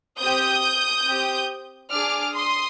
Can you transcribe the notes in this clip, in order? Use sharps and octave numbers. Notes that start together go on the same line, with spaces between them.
C4 G4 D#6 G6
C4 G4
D4 G#4 D6 F6
C6 D#6